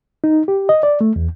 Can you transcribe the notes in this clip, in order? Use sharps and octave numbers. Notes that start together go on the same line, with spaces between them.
D#4
G4
D#5
D5
A3
E2